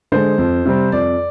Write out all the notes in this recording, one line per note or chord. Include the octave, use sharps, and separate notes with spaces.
D3 G#3 C5
F2
C3 G3 C4
F2 D5